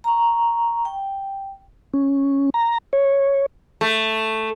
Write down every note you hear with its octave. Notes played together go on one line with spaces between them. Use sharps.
A#5 C#6
G5
C#4
A#5
C#5
A3